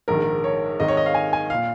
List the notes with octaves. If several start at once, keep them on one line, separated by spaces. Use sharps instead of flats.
A#1 G#2 D#3 A#4
C#5
G#1 G#2 D#3 D#5
C#5
D#5
F5
G#5
G#5
A#2 F5